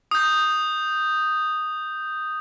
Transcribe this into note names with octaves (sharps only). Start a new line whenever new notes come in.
D#6 G6